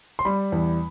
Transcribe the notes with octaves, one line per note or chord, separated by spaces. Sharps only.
C6
G3 B5
E2